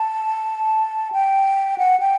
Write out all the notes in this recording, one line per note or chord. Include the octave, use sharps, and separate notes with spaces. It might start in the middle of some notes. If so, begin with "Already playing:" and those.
Already playing: A5
G5
F#5
G5